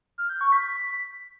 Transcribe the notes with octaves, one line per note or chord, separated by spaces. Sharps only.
F6
G6
C#6
B6
B6